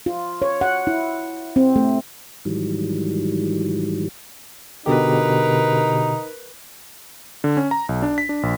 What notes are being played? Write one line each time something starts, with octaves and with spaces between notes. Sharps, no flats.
F4
C#5
F#5
E4
C4
A3
G#2 D#3 E3 F#3 G3
B2 D3 D#4 G4 A#4 B4
D3
C#4
A#5
B1
D4
B6
D4
A#1